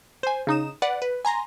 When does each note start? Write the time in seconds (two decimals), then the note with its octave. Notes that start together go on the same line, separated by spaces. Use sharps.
0.23 C5 G#5
0.47 C#3 D#4 D#6 E7
0.82 B4 D5 F#5
1.02 B4
1.25 G#5 A#5 C6 A#6